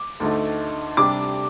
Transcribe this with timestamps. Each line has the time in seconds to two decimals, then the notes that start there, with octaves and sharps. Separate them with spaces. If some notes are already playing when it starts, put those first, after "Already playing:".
Already playing: D6
0.20 D2 D3 A3 D#4
0.97 C3 G3 D4 D6